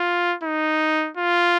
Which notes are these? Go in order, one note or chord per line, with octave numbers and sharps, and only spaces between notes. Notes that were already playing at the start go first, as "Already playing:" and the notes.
Already playing: F4
D#4
F4